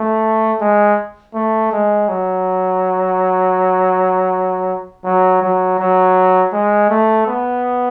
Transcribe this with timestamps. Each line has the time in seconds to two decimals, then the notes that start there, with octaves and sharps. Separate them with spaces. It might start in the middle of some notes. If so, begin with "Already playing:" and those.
Already playing: A3
0.61 G#3
1.34 A3
1.72 G#3
2.09 F#3
5.04 F#3
5.42 F#3
5.79 F#3
6.53 G#3
6.90 A3
7.27 B3